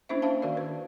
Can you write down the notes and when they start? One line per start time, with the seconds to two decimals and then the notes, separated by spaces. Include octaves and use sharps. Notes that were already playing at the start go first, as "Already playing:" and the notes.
0.09 A#3 C#4 D4 E4 C5 E5
0.22 C5 E5 F5 A5
0.42 D#3 F#4 A#4 D5
0.57 B4